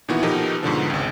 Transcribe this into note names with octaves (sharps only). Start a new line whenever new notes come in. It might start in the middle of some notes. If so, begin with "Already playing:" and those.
A#2 D#3 E3 B3 E4 F#4
B2 F3 D#4 G4 A4 A#4
G#2 B2 D3 F3
G#1 C#2